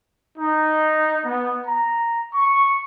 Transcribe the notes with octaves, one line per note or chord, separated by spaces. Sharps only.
D#4
B3
A#5
C#6